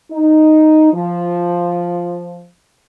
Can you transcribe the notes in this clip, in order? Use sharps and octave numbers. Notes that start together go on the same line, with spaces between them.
D#4
F3